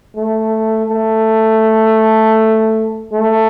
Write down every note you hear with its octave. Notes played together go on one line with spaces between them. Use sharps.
A3
A3
A3